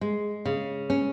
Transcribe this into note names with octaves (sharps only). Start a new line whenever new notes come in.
G#3
C#3
C#4